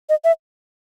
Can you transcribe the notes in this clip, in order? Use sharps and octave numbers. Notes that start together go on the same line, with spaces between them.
D#5
E5